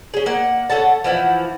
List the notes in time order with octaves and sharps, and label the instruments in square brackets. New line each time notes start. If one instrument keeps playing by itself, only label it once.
[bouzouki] C#4 G#4
A#3 F#5
C#4 A4 F#5 A5
E3 F3 E4 F#5